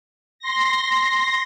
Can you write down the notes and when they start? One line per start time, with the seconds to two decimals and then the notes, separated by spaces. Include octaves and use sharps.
0.39 C6 A#6